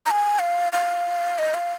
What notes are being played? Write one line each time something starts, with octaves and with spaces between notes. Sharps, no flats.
A#5
G#5
F5
F5
D#5
F5